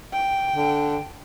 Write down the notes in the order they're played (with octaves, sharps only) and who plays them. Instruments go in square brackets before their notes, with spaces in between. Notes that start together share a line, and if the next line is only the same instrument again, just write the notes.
[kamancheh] G5
[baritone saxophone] D3